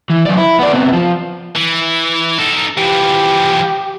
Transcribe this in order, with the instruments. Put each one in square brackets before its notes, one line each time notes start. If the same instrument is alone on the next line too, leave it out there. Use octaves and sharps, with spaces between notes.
[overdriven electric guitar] E3
F#2 D5
E4
B3 D5
C3 B3
F3
[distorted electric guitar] E3
D#4 A4
[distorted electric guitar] E3 F3 [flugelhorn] G4